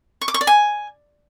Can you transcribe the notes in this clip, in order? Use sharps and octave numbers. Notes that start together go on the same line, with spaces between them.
C#6
D6
C#6
D5
G#5